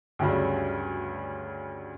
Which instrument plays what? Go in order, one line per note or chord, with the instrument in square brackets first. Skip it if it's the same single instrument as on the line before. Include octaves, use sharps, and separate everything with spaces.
[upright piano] D2 G2 C#3 F#3 G3